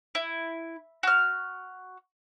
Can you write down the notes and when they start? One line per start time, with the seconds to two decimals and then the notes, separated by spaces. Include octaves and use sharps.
0.15 E4
1.03 F#4 F6